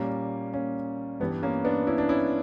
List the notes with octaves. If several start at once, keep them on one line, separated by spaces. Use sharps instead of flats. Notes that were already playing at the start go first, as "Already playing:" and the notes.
Already playing: A#2 G3 A#3 C#4
A#3 C#4
G2 E3 G3 B3
A#3 C#4
B3 D4
C#4 E4
D4
C#4 E4